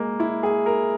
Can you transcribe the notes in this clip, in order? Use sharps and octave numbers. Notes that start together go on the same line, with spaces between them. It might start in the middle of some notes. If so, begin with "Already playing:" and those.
Already playing: G#3 A#3
E4
G#4
A#4